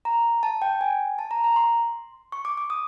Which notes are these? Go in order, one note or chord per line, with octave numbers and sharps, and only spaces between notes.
A#5
A5
G5
G#5
A5
A#5
A#5
C6
C#6
D6
D6
D#6